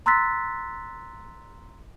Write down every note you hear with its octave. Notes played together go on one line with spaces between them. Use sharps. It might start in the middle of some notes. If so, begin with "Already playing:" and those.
A#5 C6 E6 F#6 A6 B6